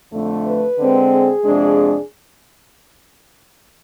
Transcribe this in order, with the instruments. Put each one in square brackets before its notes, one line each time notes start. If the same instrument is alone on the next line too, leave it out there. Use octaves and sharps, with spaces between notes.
[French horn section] F2 D3 A3
B4
D3 G#3 C4
G#4
F2 C3 G#3 D4